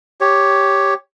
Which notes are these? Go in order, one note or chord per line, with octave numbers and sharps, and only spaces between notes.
G4 C#5